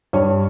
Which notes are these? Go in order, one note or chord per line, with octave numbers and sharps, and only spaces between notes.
G2 C#5